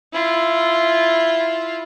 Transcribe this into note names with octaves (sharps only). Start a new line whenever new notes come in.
E4 F4